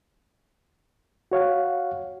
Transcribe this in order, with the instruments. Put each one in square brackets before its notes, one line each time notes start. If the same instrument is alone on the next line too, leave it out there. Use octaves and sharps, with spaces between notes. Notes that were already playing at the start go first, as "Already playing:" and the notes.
[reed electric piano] F#4 C#5 F5 F#5